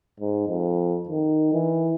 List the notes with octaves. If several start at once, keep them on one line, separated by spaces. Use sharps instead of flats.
G#2
F2
D#3
E3